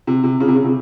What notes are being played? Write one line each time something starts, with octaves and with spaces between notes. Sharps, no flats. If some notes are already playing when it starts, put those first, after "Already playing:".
C3
C3
C#3
C3
C#3
C3